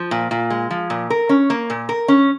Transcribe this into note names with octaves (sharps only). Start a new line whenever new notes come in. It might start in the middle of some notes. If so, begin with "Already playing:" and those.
Already playing: F3
A#2
A#2
G#3
F3
A#2
A#4
C#4
A#3
A#2
A#4
C#4